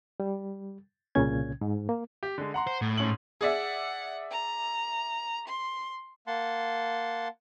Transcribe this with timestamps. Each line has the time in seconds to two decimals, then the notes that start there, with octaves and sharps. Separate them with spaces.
0.20 G3
1.15 C2 A#2 C#3 C#4 G#6
1.61 G#2
1.89 A#3
2.23 G4
2.38 D3 G#3
2.54 F#5 A#5 C6
2.67 C5
2.82 A2
2.97 G#2 C#4 F#7
3.41 G#4 D5 E5 F#5
4.31 A#5
5.48 C6
6.27 A#3 F#5 A5 C6